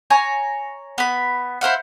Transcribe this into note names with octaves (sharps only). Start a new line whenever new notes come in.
C#5 G#5 A#5
B3 B5
E4 C5 F5 F#5